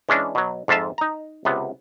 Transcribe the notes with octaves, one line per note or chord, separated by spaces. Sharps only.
E3 G#3 C#4 D4
B2 F#3
F2 G#2 F4 E5 A5
D#4 A#5
C#2 C3 B3